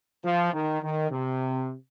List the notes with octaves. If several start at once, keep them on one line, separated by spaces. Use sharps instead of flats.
F3
D#3
D#3
C3